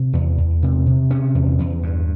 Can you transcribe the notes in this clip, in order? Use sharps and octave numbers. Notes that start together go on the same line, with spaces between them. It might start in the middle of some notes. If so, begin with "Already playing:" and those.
Already playing: C3
E2
E2
C3
C3
C3 C#4
E2
E2
G2